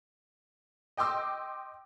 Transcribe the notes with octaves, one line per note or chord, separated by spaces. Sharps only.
D#5 G5 C6 D6 E6